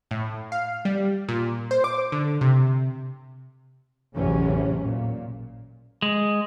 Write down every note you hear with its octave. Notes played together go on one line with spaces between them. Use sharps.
A2
F5
G3
A#2
C5
D6
D3
C3
A1 E2 C3 E3 F#3 C#4
A#2
G#3